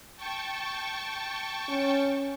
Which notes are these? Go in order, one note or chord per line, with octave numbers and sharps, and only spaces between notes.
G5 A5 C#6
C#4